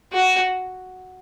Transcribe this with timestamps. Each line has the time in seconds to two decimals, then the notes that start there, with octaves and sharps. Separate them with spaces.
0.12 F#4